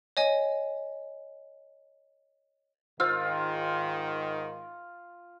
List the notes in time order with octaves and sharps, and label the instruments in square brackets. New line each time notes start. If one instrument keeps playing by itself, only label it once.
[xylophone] C#5 D#5 G#5
[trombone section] G#2 D#3 [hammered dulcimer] F4 [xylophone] C5 E6 F6